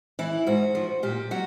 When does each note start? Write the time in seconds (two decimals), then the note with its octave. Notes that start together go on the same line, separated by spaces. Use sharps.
0.19 E3 E4
0.47 G#2 F#4
0.75 F3
1.03 A#2 G4
1.31 F#3 F#4